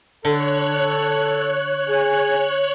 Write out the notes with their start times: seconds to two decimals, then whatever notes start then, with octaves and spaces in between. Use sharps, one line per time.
0.25 D3 A4 C#5 F#6
1.88 G#4 G#5